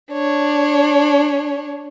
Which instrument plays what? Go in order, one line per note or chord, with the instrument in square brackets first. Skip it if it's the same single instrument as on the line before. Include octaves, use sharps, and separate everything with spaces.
[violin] D4 C#5